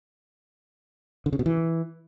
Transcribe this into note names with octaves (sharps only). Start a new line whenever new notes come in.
D3
C#3
B2
E3